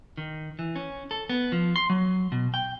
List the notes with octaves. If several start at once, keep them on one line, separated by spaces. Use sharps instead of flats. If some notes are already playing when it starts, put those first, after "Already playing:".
D#3
E3
C#4
A4
B3
F3
C6
F#3
B2
G5